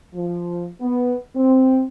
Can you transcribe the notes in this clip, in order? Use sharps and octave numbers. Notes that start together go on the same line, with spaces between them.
F3
B3
C4